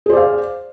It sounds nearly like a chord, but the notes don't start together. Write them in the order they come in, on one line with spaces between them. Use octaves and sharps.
G#4 C5 D5 F5